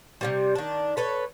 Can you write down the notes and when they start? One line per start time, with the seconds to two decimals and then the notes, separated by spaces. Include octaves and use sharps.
0.21 C3 D#3 G3
0.55 D#3 D4
0.97 A4 B4 C#5